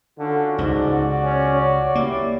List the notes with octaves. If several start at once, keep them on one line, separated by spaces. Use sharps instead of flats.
D3 C#4 F4 F#4
C#2 G#2 F#4 D5
C#4
C#5
A#3 E4 G4 D5